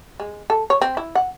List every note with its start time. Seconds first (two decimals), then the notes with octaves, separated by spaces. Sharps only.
0.20 G#3
0.50 A4
0.70 C#5
0.81 C4
0.97 E4
1.15 F#5